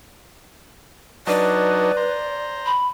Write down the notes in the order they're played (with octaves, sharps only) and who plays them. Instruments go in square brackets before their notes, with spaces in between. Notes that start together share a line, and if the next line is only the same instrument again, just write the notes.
[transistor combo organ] F#3 D4 D#4 [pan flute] B4 [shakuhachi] D5
[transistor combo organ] C5 A#5
[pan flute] B5